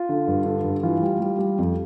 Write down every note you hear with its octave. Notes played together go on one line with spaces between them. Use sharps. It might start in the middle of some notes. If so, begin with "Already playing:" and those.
Already playing: F4
D3
G2
D3
G2
E3 F4
G3
G3
G3
F2